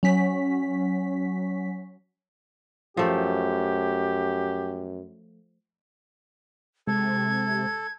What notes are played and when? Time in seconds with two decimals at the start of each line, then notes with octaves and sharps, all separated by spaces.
0.03 F#3 C#4 B6
2.97 F#2 F3 A3 G4
6.87 C3 G#3 A4 G#6